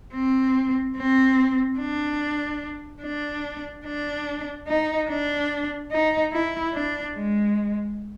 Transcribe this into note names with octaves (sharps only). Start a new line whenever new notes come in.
C4
C4
D4
D4
D4
D#4
D4
D#4
E4
D4
G#3